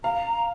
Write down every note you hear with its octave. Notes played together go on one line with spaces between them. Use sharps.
F5 A#5